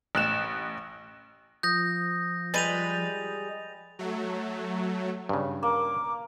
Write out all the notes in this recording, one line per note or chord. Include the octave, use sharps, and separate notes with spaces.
A1 F#6 E7
F3 D#6 G6 A#6
G3 G#3 B4 A6 D#7 F7
F#3 A3
G2 C#3
A#3 D6